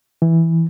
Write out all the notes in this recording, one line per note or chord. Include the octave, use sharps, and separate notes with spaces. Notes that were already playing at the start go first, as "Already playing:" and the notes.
E3